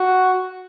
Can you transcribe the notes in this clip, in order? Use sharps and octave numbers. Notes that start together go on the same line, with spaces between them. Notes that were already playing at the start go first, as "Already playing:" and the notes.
Already playing: F#4